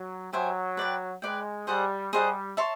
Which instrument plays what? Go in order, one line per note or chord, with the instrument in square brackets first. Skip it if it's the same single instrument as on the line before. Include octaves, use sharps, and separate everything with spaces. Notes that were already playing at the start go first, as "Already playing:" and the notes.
Already playing: [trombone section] F#3
[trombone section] F#3 [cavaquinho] G4 C5 E5 G#5
[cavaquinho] B4 D5 G5
[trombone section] G#3 [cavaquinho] B4 D5 G5
[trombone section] G3 [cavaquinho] G#4 C5 D#5 F#5
[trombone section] G3 [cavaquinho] G#4 C5 D#5 F#5
[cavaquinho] C#5 E5 A5 C6